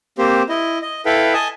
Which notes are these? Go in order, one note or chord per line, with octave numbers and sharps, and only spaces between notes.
A#3 C4 G4 C5
E4 D#5
D#5
E4 A4 B4 E5 F5 G5
D#5 G#5 A5 D#6